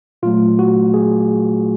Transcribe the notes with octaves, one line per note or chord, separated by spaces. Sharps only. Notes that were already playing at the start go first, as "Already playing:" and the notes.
A#2 F#3 A3 F4
F#4
G#4